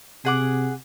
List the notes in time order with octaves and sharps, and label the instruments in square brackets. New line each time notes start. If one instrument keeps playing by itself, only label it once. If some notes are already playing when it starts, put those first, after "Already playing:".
[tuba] C3 [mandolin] G#4 F#5 D6